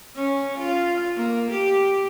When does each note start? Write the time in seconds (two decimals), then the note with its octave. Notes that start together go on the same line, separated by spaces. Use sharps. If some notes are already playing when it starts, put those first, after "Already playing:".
0.15 C#4
0.57 F4
1.15 A#3
1.50 G4